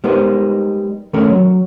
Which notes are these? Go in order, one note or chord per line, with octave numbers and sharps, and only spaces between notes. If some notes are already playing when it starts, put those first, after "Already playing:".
G3 G#3 B3 D#4 A#4 C5
D#3 A3 C#4 A4 A#4 C#5
F#3